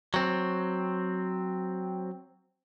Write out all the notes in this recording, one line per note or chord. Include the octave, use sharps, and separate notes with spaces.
F#3 C4